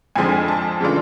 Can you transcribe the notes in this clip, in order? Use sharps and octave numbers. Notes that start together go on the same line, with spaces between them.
F2 D3 F3 G#3 C4 G#5
A5
C#3 E3 A3 D4 F4